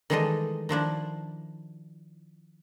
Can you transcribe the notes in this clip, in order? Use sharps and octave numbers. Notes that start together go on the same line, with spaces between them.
D#3 E3 G3 G#3 A4 D#5
D#3 F3 D4 E4